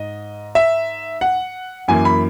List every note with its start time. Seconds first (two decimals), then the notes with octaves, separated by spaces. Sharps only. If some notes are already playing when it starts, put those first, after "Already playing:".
Already playing: G#2 D#5
0.55 E5
1.21 F#5
1.88 F#2 E3 A#3 G#5
2.05 B5